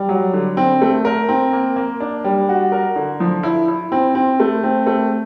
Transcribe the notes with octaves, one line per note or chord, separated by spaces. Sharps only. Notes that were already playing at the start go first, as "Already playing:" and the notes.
Already playing: G3
F#3
D3
C4
A3
A#4
C4
A#3
A#3
D4
G3
F#4
A#4
D3
F3
E4
E4
C4
C4
A3
C4
A3